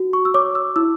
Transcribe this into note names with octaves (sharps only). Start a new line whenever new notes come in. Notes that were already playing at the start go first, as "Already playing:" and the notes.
Already playing: F#4
C#6
E6
C#5 D6
E6
E4 E6